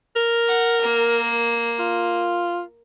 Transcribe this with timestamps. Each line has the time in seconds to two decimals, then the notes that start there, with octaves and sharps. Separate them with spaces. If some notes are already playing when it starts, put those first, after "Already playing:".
0.16 A#4
0.48 F#5
0.82 A#3
1.79 F4